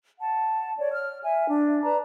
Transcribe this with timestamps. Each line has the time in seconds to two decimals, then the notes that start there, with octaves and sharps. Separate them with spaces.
0.19 F#5 A5
0.77 C#5 D5
0.92 F6
1.22 E5 G#5
1.48 D4
1.83 B4 D5 A5 A#5